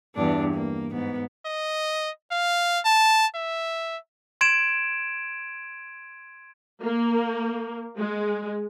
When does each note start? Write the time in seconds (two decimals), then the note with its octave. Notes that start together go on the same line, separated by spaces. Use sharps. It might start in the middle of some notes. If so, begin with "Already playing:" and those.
0.15 E2 G2 D4
0.53 A#3
0.91 G#2 B3
1.46 D#5
2.31 F5
2.85 A5
3.35 E5
4.41 C6 G#6 D7 E7
6.84 A#3
7.98 G#3